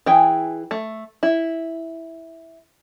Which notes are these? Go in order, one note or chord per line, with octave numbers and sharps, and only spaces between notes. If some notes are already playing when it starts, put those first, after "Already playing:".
E3 G#4 G5
A3
E4